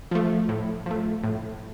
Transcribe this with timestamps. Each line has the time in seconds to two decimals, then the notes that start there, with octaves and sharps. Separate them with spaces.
0.11 F3 A3
0.49 A2
0.86 F3 A3
1.24 A2